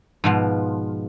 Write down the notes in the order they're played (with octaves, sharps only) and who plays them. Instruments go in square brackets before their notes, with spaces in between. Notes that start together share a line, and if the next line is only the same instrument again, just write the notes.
[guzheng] G#2 B2 F3